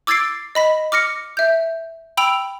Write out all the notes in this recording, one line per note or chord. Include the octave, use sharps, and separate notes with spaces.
D6 E6 G#6 A6 C7 D7
D#5 B5 B6
D6 F6 A#6 C#7
E5 G6
G5 B5 E6 D7 F7 F#7